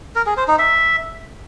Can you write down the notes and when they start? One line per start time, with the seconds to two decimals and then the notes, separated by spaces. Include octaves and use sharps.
0.15 A#4
0.26 G#4
0.37 C5
0.48 D#4
0.59 E5